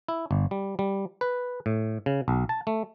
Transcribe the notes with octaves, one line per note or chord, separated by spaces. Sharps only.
E4
G1
G3
G3
B4
A2
C#3
B1
A5
A3